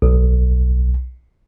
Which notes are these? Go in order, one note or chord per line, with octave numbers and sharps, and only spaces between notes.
B1